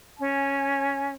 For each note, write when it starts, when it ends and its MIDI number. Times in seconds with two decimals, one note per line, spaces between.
0.19 1.14 61
0.19 1.12 80